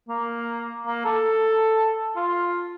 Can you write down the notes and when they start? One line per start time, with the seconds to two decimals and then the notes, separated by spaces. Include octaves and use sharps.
0.09 A#3
0.87 A#3
1.05 A4
2.16 F4